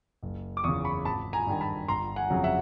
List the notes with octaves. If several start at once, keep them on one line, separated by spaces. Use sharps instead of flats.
F#1
D6
E2 C#3 C#6 D#6
B5 C#6
G#1 A5 B5
G#5 A#5
G2 D#3
A5 B5
G1 A#5 C6
F#5 G#5
F2 C#3 F#3
E5 F#5